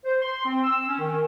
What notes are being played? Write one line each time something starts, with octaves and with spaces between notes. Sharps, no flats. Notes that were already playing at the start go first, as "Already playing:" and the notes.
C5
C6
C4
E6
C#4
D#3